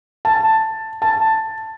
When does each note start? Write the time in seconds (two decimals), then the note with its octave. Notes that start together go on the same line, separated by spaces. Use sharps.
0.25 A5
1.02 A5